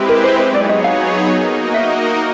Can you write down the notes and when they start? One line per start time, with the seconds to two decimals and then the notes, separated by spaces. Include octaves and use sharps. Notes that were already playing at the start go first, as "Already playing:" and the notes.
Already playing: G#3 C4 E4 G4 B4
0.09 A#4
0.24 C5
0.39 F#3 B3 D#4 G#4 C5 C#5
0.54 D5
0.64 D5
0.69 D#5
0.84 F5
1.29 A#3 D#4 F#4 A#4 D#5
1.74 E5